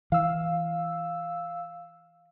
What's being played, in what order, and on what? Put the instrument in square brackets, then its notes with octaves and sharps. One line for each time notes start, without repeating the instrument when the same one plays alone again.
[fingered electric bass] E3 [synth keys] F5 E6